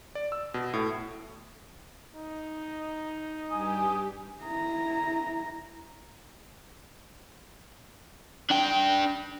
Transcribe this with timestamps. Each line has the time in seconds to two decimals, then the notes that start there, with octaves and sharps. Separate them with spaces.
0.15 D5
0.32 E6
0.54 B2
0.73 A2
2.15 D#4
3.50 G2 G4 G#5 D#6
4.44 E4 A#5
8.51 D4 G5